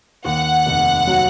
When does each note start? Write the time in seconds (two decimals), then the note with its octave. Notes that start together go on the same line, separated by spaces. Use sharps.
0.25 D#2 F#5
0.66 F1
1.07 F#3